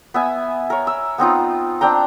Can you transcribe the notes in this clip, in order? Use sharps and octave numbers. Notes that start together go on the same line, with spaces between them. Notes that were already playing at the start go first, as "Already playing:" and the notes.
B3 E5 G#5
A#4 C#5
E6
B3 C4 D#4 F4
C4 D4 G5 A#5